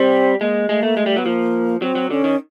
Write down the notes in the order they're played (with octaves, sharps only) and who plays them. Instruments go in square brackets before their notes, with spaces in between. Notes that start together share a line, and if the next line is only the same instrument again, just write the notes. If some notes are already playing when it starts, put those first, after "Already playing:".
Already playing: [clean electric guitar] G3 [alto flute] C4
[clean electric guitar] G#3 [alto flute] A#3
[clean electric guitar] G#3 [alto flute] A3
[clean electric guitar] A3 [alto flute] A#3
[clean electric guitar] G#3 [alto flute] A3
[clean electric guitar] G3
[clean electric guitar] F#3 [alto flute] B3
[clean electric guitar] F3 [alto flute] A#3
[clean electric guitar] F#3 [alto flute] C4
[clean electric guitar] F#3
[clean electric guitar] D3 [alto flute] C#4
[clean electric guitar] D#3